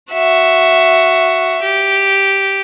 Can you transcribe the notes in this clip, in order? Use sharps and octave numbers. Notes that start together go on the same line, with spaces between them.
F#4 E5
G4